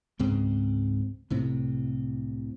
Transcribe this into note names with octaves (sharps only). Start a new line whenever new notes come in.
C#2 G#2 C4
C2 A2 C3